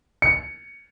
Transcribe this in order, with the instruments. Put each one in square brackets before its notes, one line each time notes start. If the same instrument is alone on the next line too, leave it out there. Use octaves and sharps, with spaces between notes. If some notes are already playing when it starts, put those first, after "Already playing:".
[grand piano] C#7